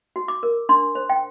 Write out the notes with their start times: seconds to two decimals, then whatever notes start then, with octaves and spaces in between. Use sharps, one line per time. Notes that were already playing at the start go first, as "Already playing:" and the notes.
0.16 F#4
0.28 D6
0.43 A#4
0.69 D4 C6
0.95 C5
1.10 G5